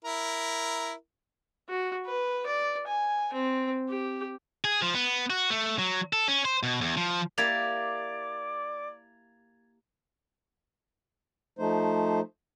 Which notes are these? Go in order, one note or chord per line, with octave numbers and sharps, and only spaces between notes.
E4 A#4
F#4
B4
D5
G#5
C4
G4
G#4
F3
B3
F#4
A3
F#3
A4
C#4
C5
B2
E2
F3
A#3 E4 G4 D5 G#6 A6 F7
F3 A3 D#4 C5